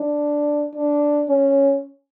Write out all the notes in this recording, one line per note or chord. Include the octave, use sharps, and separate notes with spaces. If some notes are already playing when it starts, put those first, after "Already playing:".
Already playing: D4
D4
C#4